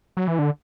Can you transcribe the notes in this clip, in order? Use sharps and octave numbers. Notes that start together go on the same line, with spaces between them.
F#3
E3
D3